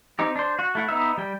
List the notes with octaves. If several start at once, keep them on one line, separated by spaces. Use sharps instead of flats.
C4 D#4 G4
D4 C5
F#4
A3 E4 F#5
B3 D#4 E5
G3 G5